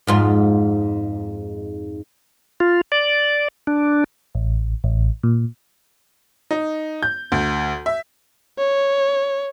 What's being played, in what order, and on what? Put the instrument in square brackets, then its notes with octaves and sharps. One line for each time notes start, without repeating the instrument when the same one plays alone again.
[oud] F2 G#2 F4
[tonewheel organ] F4
D5
D4
[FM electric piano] A1
A1
A#2
[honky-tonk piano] D#4
G6
D2
E5
[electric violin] C#5